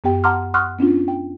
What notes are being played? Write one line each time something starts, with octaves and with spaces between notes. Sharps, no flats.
F#2 B3 G4 G5
F#5 A5 A#5 C6 D6 F6
F#5 C6 C#6 D#6 F6 F#6
B3 C#4 D4 F4
G5